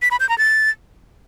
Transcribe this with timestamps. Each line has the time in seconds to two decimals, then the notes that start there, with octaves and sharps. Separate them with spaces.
0.02 B6
0.11 B5
0.20 G6
0.29 A#5
0.38 A6